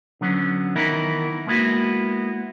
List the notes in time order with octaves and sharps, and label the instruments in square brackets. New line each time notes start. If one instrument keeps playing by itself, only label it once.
[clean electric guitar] D3 F#3 B3 C#4
D#3 E3 B3 D#4 E4 A#4
G#3 A#3 B3 E4 F#4